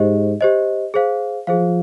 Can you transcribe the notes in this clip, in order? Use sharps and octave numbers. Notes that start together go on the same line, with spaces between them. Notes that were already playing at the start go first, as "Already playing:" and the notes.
Already playing: G#2 G4 C5 D#5
G4 C5 D#5
G#4 C5 F5
F3 G#4 C5 F5